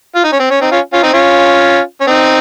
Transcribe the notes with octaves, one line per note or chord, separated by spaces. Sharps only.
F4
D#4
C#4
C4
C#4
C4 D#4
C#4 F4
C#4 F4
C4 D#4
C#4 F4
C#4
C4 D#4